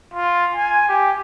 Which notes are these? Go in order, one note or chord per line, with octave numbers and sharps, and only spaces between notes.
F4
G#5
G4